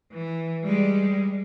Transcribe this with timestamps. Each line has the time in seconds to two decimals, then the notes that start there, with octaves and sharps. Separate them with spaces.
0.12 E3
0.64 G3 G#3